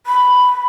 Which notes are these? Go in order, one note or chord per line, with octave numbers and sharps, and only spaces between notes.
B5